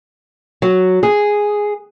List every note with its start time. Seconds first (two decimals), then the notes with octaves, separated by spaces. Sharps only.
0.62 F#3
1.03 G#4